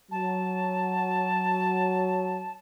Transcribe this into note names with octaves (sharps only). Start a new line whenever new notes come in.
F#3 A5